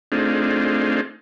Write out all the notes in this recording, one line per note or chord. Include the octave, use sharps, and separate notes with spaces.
A3 C4 D4 D#4 F4 G#4